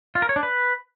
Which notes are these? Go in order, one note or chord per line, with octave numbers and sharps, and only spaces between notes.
F4
A#4
C#5
D4
B4